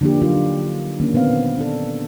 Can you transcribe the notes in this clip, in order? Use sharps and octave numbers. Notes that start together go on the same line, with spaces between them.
D3 F3 A#3 D4 G4
F3 F#3 D4 D#4 F4 G4
D3 D#3 A#3 C#4
A#2 B3 C4 F5
D4 A4